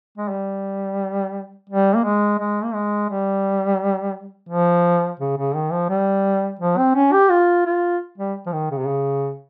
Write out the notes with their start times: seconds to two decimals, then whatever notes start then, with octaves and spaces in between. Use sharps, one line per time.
0.18 G#3
0.29 G3
1.69 G3
1.95 A#3
2.04 G#3
2.39 G#3
2.64 A#3
2.74 G#3
3.09 G3
4.49 F3
5.20 C#3
5.38 C#3
5.55 D#3
5.72 F3
5.89 G3
6.59 F3
6.78 C4
6.95 C#4
7.13 G4
7.30 F4
7.66 F4
8.18 G3
8.46 F3
8.53 D#3
8.71 C#3
8.79 C3
8.87 C#3